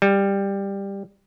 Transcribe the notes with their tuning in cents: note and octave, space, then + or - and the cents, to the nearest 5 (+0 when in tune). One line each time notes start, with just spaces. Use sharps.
G3 +10